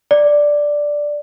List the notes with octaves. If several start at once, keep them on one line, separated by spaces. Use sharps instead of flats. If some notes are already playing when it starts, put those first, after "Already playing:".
D5